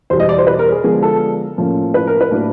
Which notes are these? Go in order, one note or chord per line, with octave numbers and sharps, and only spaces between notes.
E2 B2 G3 C5
D#5
D5
C5
B4
A#4
G#4
D3 F3 G#3 B3 D4 G#4
A4
A2 F3 A#3 C#4
B4
A#4
B4
A2 F#3 A#3 D4